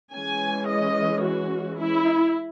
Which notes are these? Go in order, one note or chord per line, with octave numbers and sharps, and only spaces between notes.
E3 G#3 C#4 G#5
D#5
F#4
E4